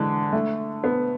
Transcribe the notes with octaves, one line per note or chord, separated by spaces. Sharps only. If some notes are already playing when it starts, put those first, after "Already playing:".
Already playing: D3 E3 G#3
A3
B3